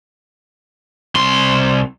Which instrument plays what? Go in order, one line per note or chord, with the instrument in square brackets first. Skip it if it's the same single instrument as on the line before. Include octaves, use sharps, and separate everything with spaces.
[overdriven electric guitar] C2 C6